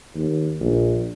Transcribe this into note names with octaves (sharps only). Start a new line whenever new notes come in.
D#2
A#1